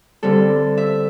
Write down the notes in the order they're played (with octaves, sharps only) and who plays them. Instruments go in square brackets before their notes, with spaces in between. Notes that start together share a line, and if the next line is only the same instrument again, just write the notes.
[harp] D3 G3 C4 A4
E5